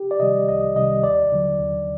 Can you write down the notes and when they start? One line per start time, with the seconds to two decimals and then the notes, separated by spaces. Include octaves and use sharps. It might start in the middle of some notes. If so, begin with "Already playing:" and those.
Already playing: G4
0.11 D5
0.20 C3 D#3 G3 D#5
0.48 C2 D#5
0.76 C3 D#3 G3 D#5
1.03 D#2 D5
1.32 D3 F#3
1.60 D#2